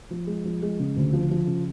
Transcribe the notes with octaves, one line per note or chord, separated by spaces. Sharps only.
F3
G#3
F3
G#3
C#3
D2
F3
F3
C#3